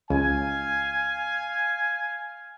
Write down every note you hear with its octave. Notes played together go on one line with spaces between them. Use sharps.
C#2 F5 G#5